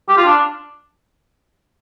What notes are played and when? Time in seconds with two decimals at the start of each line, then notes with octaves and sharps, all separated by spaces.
0.09 G4
0.18 F4
0.26 D4